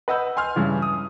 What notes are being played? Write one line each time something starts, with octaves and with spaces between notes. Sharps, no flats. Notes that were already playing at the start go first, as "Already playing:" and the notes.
B4 D#5 F#5 E6 G6
G#5 C6 F6
G2 C#3 E3
D#6